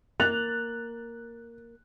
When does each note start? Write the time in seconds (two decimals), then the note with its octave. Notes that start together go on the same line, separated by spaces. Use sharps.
0.20 A#3 F#6 A6 F7